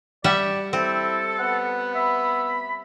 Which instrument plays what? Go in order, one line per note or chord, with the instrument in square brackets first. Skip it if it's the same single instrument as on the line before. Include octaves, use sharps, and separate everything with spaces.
[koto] G3 E5 F#5 [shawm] D5
[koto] C4 [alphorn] E4 [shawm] A4
[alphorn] B3 [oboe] F#5
[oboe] E5 [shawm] B5